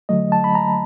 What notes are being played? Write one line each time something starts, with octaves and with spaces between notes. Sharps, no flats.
D3 F#3 A3 D#5
A5
B5
A#5